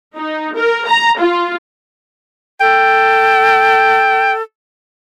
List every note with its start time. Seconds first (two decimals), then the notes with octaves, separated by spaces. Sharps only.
0.16 D#4
0.56 A#4
0.88 A#5
1.19 F4
2.60 A4 G5